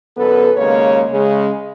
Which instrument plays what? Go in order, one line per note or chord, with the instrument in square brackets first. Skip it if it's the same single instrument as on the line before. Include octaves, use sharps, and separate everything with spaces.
[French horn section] F#2 D3 B3 A4 B4
D#2 C#3 G#3 A#3 C#5
C#3 G#3